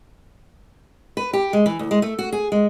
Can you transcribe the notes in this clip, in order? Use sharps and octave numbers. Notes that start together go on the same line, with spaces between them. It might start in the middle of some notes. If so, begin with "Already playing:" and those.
B4
G4
G#3
E3
D2
G#3
A3
F#4
G#4
G#3